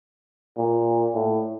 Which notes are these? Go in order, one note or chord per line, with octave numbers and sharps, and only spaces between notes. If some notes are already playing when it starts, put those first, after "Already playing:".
A#2
A2